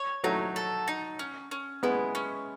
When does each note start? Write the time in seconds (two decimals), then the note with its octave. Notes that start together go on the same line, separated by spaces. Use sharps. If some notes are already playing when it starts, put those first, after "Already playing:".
Already playing: C#5
0.24 F#3 A3 D#4
0.56 A4
0.88 D#4
1.19 C#4
1.51 C#4
1.83 G#3 B3 E4
2.15 C#4